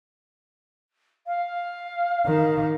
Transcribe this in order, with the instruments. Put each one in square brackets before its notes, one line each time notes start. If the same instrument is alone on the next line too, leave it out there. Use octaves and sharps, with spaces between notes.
[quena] F5
[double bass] D#3